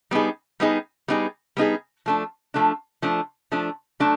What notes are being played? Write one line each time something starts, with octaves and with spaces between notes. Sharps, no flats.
G3 B3 D#4 G#4
G3 B3 D#4 G#4
G3 B3 D#4 G#4
G3 B3 D#4 G#4
F3 A3 D4
F3 A3 D4
F3 A3 D4
F3 A3 D4
F#3 A3 D4